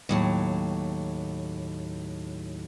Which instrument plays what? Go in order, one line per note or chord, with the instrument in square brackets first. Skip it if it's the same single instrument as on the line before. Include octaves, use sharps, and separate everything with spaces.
[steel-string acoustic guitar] D#2 A2 F#3